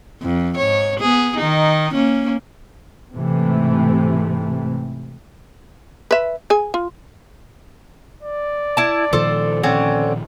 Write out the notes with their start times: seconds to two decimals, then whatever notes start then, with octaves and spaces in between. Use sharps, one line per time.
0.22 F2
0.57 G#2 C#5
1.00 B3 G#4
1.37 D#3 D#4
1.94 A#3 C#4
3.13 G#2 C3 E3 A3
6.11 B4 E5
6.50 G#4 G#5
6.74 F4
8.23 D5
8.77 E4 A5
9.13 A#2 D#3 F3 A4 C5
9.63 D3 C4 C#4